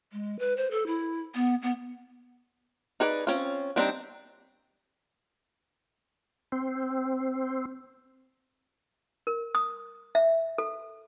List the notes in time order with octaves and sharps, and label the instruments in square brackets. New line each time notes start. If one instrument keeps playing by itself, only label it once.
[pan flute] G#3
B4
C5
A4
E4
B3
B3
[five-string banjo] D#4 G#4 B4 D5
C4 C#4 F4
G3 C4 D4 D#4
[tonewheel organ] C4
[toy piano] A#4
D#6
E5
A4